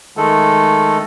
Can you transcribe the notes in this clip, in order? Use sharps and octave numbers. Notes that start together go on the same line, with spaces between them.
D#3 G#3 A3 A4